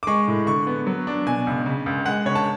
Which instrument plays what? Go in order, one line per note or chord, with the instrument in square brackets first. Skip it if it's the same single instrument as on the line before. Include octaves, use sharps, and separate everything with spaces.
[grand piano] D6
G#3 C#6
A2
D3 C#6
B3
F#3
D4
B2 G#5
C#2
C#3
C#2
G#3 F#5
C#3 C#5
A5